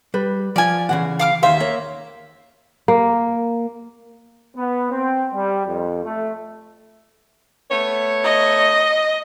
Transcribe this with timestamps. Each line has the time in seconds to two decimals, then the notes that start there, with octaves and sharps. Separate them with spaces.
0.14 G3 B4
0.56 F3 F4 D5 G#5
0.89 C#3 E3 F#5
1.20 F5 D6 F6
1.43 D#2 D#3 C5 E5 F5
1.60 A#3 C#5
2.88 A#3
4.56 B3
4.91 C4
5.33 G3
5.66 F2
6.04 A3
7.71 A3 B3 C#5
8.24 D#5